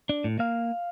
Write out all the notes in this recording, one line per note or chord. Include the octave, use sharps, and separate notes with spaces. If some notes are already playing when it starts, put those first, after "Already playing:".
D4
A2
A#3 F5